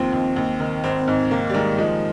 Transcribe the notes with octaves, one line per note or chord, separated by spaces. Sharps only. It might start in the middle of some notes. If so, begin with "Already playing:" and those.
Already playing: D#2 F3 C4
D#2
D#2
D#3
G#1 C4
G#2
D#3 A#3
G3
D#3 G#3
F3 G#3